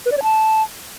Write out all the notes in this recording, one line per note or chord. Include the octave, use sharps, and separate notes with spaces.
B4
D5
C#5
A5